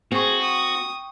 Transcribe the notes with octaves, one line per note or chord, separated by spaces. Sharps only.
C4 F#4 G#4 G5 C#6
D#6